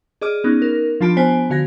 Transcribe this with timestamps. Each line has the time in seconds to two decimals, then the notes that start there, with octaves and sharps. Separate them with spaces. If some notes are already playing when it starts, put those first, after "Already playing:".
0.21 G#4 D5 D#5 D6 F6 D#7
0.44 B3 C#4 D#4
0.62 A#4
1.01 F3 D4 F4 A5 B5 D7
1.17 B3 C5 G#5 B6
1.50 D3 F#4 F5 G#6 A#6